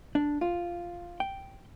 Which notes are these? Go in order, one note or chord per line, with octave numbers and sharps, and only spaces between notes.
D4
F4
G5